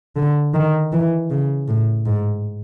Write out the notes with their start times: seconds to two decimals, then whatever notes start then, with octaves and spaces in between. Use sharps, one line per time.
0.16 D3
0.54 D#3
0.93 E3
1.30 C#3
1.68 A2
2.06 G#2